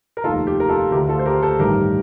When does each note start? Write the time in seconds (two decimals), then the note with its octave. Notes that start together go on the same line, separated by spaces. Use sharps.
0.17 A#4
0.24 F1 D#2 D#3 F4 A4
0.47 G4
0.60 A#4
0.69 F4 A4
0.92 D2 D3 G4 A#4
1.09 F4 A4
1.19 C5
1.26 G4 A#4
1.42 A4 C5
1.59 A1 G2 D#3 G4 A#4